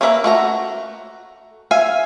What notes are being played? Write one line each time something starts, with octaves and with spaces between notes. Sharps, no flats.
A#3 C#4 A#4 B4 E5
A3 F#4 A#5
E5 F5 G#5